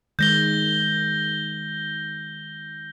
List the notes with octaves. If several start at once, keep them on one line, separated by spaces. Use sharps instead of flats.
D#3 G#3 G6 A#6 G7